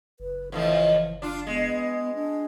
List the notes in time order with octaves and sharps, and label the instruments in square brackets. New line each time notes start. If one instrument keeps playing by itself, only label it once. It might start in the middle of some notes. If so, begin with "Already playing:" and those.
[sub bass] F#1 [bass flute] B4
[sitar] F2 A2 F3 [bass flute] E3
[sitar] D4 F4
[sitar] G#3 [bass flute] B3
[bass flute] D4